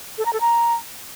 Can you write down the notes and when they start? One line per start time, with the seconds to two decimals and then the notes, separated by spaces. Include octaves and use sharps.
0.18 A4
0.26 A#5
0.33 A4
0.41 A#5